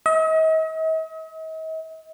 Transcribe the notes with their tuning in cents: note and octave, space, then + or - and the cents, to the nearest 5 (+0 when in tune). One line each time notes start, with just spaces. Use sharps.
D#5 +45